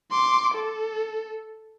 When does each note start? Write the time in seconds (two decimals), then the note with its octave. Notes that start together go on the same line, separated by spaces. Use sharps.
0.11 C6 D6
0.54 A4